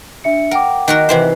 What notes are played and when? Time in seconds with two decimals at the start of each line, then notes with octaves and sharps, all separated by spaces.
0.24 D4 E5 C#7
0.51 A#4 F#5 G5 D6
0.88 D#3 F#4 A#4
1.09 C3 E3 C5